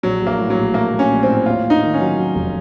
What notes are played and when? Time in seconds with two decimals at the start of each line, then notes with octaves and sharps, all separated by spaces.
0.03 A#1 F#3
0.21 A#1
0.27 A#3
0.39 A2
0.50 F#3
0.57 A#1
0.74 A3 A#3
0.92 A3
0.99 C#4
1.11 A#1
1.23 C4
1.28 A2
1.46 D#2 F4
1.65 D#2
1.70 D#4
1.82 D#3
1.94 C#4
2.00 F#3
2.18 F#3
2.35 F1